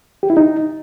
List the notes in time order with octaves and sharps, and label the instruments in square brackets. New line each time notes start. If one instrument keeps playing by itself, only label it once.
[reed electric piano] G4
E4
D#4